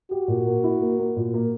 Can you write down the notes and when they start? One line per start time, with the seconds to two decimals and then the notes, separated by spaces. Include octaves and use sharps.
0.11 F#4 G4
0.28 A#2
0.46 A#3
0.64 E4
0.82 A#3
0.99 A#3
1.16 A#2
1.34 A#3